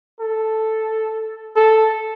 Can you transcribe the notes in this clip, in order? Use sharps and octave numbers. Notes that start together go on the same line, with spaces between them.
A4
A4